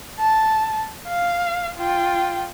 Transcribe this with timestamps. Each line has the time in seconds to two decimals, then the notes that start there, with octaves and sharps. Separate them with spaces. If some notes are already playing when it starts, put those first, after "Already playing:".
0.19 A5
1.08 F5
1.77 F4 G5